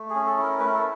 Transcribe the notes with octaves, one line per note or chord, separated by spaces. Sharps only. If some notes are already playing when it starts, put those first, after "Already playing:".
Already playing: A3
G#4
C#4
A4
E4
A#4
A3 B4
A#4
A4